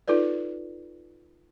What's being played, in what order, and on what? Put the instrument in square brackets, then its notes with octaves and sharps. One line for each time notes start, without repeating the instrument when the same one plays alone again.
[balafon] D#4 F4 A4 B4 D5